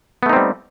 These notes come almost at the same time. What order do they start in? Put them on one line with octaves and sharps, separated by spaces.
B3 A3 D#4 C4 G3